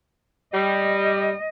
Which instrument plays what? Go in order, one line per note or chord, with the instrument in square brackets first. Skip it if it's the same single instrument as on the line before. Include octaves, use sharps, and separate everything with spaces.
[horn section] G3 [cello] D#5